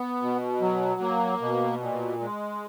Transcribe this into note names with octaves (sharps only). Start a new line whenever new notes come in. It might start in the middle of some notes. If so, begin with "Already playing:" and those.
Already playing: B3
B2
F#3
A#3
B2
A#2
G#3